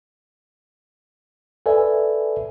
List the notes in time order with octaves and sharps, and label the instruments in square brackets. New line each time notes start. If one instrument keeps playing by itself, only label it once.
[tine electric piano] A4 B4 D5 E5 G#5